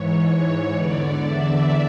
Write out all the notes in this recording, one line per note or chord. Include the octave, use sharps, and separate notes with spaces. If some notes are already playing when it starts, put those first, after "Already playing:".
Already playing: G#2 E3 C#5
C#5
E2 D3 D5
E5